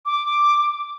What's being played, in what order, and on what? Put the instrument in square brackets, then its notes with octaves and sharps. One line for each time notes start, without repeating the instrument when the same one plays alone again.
[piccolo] D6